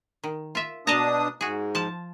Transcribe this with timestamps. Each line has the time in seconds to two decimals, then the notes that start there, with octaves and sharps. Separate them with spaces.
0.24 D#3
0.55 F4 E5
0.87 B2 D4 D#5 A5 A#5 D#6
1.41 G#2 F#4 G#4
1.75 F3 A5